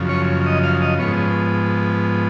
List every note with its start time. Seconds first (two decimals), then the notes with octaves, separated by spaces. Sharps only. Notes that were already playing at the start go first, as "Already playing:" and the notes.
Already playing: F#2 C#3 F3
0.09 C#5
0.46 D#5
0.64 F5
0.82 D#5
0.99 G#2 F3 B3 C#5